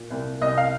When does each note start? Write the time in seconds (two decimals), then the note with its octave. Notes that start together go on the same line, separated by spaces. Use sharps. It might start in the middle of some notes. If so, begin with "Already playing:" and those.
Already playing: A#2
0.11 C2
0.41 C2 D#5
0.58 F5